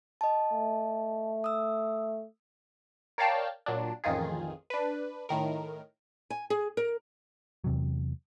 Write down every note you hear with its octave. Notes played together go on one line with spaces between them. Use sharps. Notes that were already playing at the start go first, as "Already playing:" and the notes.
D#5 A5
A3
D#6 E6
A#4 C#5 D5 F5 G5 A5
A#2 F#3 D4
A1 F2 D#3 F4 G#4
D4 B4
A2 D#3 A#4
G#5
G#4
A#4
E2 C3 F#3